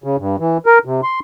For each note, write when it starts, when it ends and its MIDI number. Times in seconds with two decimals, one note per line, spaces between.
0.04 0.16 49
0.18 0.36 43
0.40 0.58 52
0.66 0.79 70
0.85 1.01 48
1.03 1.20 84